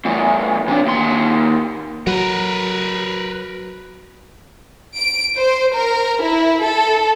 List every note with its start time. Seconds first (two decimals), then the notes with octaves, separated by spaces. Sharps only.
0.05 E2 A2
0.68 C3 D4
0.86 D#2 C6
2.07 F#3 A#4 B4
4.96 D7
5.37 C5
5.76 A#4
6.23 E4
6.65 A4